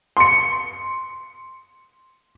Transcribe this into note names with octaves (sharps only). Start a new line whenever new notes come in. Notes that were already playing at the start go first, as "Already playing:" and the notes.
C6 C#7